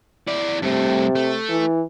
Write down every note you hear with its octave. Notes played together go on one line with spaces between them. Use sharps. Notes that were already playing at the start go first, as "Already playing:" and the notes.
E4 D5
G2 C3 A3
A3
E3